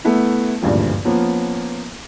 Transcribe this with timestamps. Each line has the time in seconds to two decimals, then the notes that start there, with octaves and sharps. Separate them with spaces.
0.05 A3 B3 E4
0.62 G#1 D2 G2 A#2 F3
1.05 F3 A#3 B3 C#4